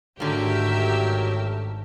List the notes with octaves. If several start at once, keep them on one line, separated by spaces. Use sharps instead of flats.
G#1 D3 F#3 A3 G4 A#4 E5